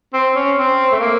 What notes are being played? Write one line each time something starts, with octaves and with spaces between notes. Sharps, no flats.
C4
C#4
C4
A3
A#3